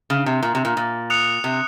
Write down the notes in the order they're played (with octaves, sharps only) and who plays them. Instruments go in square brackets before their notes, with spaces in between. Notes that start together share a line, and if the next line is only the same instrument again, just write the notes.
[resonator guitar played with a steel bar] C#3
C3
A#2
C3
A#2
A#2
[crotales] D#6 F#6 C#7 F7
[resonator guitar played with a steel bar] C3